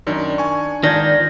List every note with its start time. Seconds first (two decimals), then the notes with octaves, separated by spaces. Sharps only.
0.07 F#2 D#3 D4
0.38 G#5 C#6
0.84 G#2 D#3 F4 D5 A5 G6 G#6 A#6